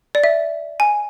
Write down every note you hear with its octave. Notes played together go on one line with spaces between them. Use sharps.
D5
E5
G#5